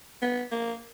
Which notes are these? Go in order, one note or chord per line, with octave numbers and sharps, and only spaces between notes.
B3
A#3